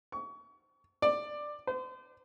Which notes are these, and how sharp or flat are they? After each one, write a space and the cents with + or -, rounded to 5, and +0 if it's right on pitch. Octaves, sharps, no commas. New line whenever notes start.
C#6 +30
D5 +10
C5 -40